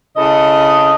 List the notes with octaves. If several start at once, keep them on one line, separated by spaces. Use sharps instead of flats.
C#3 E4 A4 D#5